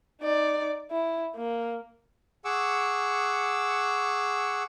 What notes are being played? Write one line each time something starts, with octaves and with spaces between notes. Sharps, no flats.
D#4 D5
E4
A#3
G#4 F#5 C#6 D6 E6